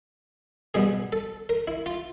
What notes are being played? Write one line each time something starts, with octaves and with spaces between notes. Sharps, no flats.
B2 G3 B3 G#4
A4
A#4
E4
F4